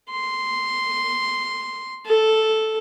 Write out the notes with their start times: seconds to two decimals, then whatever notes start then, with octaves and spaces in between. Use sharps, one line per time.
0.11 C6
2.06 A4